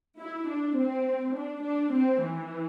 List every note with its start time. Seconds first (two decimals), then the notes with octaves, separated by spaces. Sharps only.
0.19 E4
0.49 D4
0.77 C4
1.35 D4
1.64 D4
1.93 C4
2.23 E3